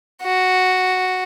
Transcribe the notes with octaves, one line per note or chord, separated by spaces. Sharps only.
F#4